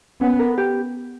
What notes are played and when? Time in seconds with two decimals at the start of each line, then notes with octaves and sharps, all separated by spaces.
0.21 B3 C#4
0.39 A#4
0.58 G4